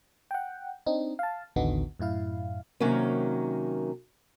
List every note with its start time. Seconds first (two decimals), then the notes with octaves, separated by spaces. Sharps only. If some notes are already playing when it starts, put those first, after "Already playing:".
0.31 F#5 G5
0.86 C4 D4 D#4
1.19 F5 A5
1.56 A1 D#2 D3 B3 D#4 F#4
1.99 F#2 A2 E4 F5
2.80 C3 D#3 F#3 A#3 C#4